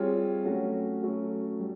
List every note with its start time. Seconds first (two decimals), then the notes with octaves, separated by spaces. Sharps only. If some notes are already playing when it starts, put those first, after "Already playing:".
Already playing: G3 C4 F4 G#4 C#5
0.44 F#3 A3 C#4 F#4
1.03 F#3 A3 C#4 F#4
1.60 G3